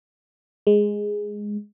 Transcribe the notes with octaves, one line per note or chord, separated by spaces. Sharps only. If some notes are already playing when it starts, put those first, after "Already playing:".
G#3